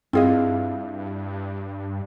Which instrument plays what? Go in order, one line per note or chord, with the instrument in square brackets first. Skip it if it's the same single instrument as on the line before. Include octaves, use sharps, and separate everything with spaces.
[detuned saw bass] G2 [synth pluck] C4 G#4 D#5 [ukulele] E4 F4 F5